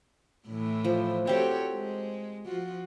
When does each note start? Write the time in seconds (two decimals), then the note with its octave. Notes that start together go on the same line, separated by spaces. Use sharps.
0.47 A2 E3
0.85 F3
1.27 C4 F#4 G4 A4 C#5
1.74 G#3
2.46 F3 F4 F#4